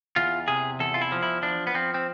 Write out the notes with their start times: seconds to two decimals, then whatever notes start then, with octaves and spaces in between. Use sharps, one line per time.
0.16 E2 F4
0.48 C3 G#4
0.80 E2 A4
0.94 F4
1.01 E4
1.12 F3
1.23 E4
1.42 F3 D4
1.67 B3
1.74 F3 C4
1.94 C4